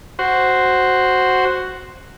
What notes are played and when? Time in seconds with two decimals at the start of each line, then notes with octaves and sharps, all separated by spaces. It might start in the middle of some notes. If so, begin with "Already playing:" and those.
0.19 F#4 C5